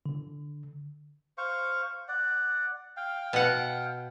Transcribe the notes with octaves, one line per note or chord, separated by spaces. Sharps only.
D3
C5 F5 C#6
D5 F#5
F5 G5
B2 F#5